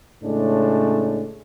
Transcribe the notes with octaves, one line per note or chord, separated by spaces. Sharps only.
A2 C#3 G#3 A3 D4